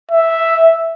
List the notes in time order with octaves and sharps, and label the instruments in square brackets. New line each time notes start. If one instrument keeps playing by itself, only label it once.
[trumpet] E5